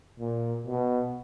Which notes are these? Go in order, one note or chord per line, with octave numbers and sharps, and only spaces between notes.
A#2
B2